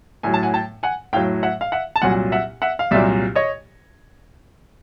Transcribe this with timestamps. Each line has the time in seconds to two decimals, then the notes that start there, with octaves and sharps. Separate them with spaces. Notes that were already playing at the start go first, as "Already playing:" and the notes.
0.23 A2 F#3 G#5
0.34 A5
0.43 F#5 G#5
0.54 G5 A5
0.83 F#5 G#5
1.13 A2 F#3 F5 G5
1.43 E5 F#5
1.61 F5
1.72 E5 F#5
1.96 A5
2.02 C2 A#2 F#3 F#5 G#5
2.32 E5 F#5
2.62 E5 F#5
2.79 F5
2.91 C2 A#2 F#3 D5 E5
3.35 C#5 D#5